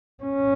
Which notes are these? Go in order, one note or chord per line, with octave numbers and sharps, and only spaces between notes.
C#4